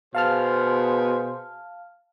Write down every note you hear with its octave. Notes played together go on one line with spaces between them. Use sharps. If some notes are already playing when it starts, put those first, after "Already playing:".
B2 G#4 C5 F5 A5 F6